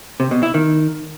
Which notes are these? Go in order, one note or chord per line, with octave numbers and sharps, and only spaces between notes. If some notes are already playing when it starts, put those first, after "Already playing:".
C3
B2
E4
D#3